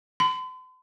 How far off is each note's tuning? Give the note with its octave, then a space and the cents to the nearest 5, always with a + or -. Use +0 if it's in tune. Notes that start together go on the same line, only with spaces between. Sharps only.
C6 -45